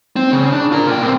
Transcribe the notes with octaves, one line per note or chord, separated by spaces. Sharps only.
C4
C#3
D4
F4 A#4
A#2 G5
A#2 C4